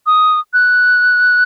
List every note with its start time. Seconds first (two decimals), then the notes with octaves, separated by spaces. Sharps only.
0.06 D#6
0.53 F#6